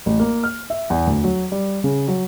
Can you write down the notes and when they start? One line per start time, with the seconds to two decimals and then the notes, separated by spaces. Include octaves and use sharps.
0.06 A1
0.19 A#3
0.44 F6
0.70 E5
0.90 E2
1.07 D2
1.24 F#3
1.52 G3
1.84 C#3
2.08 F#3